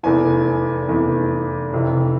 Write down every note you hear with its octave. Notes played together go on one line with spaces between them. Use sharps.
F1 E2 E3 G#5
F1 E2 E3
F1 F2 C3 E3